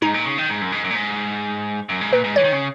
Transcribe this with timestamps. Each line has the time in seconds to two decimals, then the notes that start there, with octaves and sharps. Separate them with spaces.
0.02 G#2 D#4
0.14 A#2
0.25 C#3
0.38 D#3
0.49 G#2
0.61 F#2
0.72 G#2
0.84 F#2
0.91 A#2
0.95 G#2
1.89 F#2
2.01 G#2
2.13 A#2 B4
2.24 G#2
2.36 E3 C#5
2.44 D#3
2.52 C#3